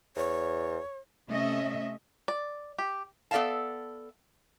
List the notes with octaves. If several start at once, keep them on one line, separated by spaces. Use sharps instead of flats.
E2 C#5
C3 A3 C#4 D#5 E5
D5
G4
B3 A4 D5 E5 F5 A5